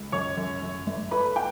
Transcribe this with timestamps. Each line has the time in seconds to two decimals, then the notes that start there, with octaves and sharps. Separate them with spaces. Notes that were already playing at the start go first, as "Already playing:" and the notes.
Already playing: C#2
0.12 F#2 C#5 C#6
0.37 F#2
0.62 F#2
0.87 G1
1.11 A3 B4 B5
1.36 G5